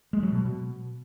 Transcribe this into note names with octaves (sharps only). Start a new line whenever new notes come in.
G#3
F#3
B2